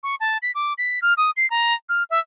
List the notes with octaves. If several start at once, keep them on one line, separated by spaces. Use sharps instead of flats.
C#6
A5
B6
D6
B6
F6
D#6
C7
A#5
F6
E5